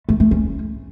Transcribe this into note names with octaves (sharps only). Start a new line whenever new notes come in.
A3
A3
C#4